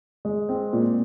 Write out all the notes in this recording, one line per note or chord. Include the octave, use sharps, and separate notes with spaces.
G#3
C4
A#2